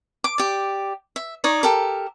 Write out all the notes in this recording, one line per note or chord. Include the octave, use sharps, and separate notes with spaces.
D6
G4 D5
E5
D#4 C#5 D5
G4 A4 A#4